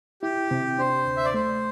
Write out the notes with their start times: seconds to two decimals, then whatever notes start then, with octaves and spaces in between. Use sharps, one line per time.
0.22 E4 G4
0.51 C3
0.79 D4 C5
1.06 D2
1.17 E5
1.25 D5
1.34 A3 C5